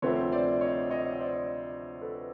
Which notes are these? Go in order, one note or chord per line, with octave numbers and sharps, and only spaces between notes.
D2 C3 F3 A3 C4 B4 C#5
C5 D5
C#5 D#5
C#5 D#5
D#5
C5 D5
A4 B4